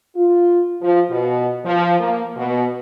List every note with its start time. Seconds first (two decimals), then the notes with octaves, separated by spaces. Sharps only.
0.15 F4
0.81 F3
1.10 B2
1.64 F3
1.99 A#3
2.36 B2